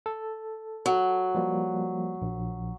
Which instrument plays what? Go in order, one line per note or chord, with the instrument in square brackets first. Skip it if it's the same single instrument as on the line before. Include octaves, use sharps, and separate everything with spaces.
[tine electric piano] A4
[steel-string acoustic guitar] F#3
[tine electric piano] F3 G3 A#3
A#1